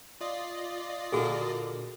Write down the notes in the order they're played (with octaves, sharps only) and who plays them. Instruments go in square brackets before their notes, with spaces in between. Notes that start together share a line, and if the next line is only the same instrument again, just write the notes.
[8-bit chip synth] F4 D5 D#5
[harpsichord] A#2 D3 A#3 [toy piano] F#4 G#4 A4